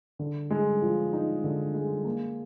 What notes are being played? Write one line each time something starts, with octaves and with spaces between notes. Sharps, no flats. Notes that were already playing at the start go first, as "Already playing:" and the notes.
D3
G#3
F3
D#4
D3
G#3
A#3